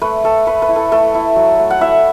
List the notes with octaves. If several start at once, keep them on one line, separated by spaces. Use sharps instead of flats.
A3 B4
A3 A4
A3 B4
B4
E4
A4
A3 A4
E4
F#3
A3
F#5
E4 E5